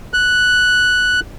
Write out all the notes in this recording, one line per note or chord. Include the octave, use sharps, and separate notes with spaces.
F#6